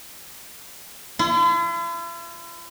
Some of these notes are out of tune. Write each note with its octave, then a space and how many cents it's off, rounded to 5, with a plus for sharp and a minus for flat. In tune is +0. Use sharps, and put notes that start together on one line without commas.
E4 +45